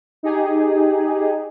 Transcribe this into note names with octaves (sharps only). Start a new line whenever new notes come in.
D#4 G4 G#4